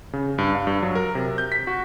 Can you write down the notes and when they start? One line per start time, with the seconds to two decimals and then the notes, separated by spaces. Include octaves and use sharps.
0.13 C#3
0.38 G2
0.55 F5
0.67 G2
0.83 F#3
0.95 A#4
1.15 C3
1.38 G6
1.52 B6
1.67 F#4